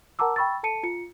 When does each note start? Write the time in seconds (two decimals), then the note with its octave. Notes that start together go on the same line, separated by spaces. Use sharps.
0.19 A#4 F#5 A5 A#5 D6 E6
0.36 G5 B5 C#6 E6 A6
0.63 A4 A5 C#7 D#7
0.83 F4 C#7